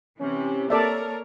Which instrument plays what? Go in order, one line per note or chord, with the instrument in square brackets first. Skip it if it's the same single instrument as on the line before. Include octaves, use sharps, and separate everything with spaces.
[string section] C3 E3 [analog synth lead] C#4
[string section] A#3 A#4 C#5 [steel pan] A4 D5 E5 [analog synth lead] A5